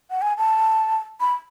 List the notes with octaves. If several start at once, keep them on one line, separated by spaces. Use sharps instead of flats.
F#5
G#5
A5
B5